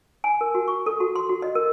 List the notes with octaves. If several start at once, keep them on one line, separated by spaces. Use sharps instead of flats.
G#5
A#4
F#4
C#6
A4
F#4
C6
F#4
D#5
A#4